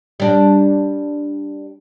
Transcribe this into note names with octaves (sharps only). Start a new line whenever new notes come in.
G3 D4